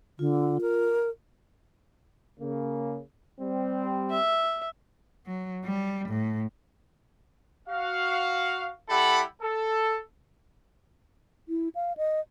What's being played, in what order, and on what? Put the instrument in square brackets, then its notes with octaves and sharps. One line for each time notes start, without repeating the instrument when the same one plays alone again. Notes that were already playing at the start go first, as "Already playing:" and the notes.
[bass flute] D3 [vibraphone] F4
[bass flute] A#4
[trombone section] C#3 A#3
G3 C4
[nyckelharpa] E5
[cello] F#3
G3
A2
[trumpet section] F#4 F5
G3 E4 G4 A4 F#5 B5
A4
[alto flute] E4
F5
D#5